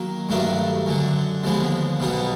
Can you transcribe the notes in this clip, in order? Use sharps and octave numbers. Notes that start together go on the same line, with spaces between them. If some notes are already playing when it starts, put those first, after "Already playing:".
Already playing: D#3 F#3 A#3
G2 D#3 F#3 A3 D4
F#2 D3 F#3
D#2 D3 F3 G#3 B3
B1 B2 G3 B3 D#4